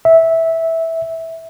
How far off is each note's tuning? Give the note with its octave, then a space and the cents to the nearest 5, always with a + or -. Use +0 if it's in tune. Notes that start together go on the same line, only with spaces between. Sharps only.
E5 -10